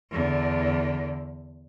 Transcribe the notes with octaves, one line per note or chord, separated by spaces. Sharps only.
E2 D3